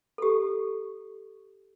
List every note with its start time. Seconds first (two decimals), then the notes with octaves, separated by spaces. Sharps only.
0.18 G4 A4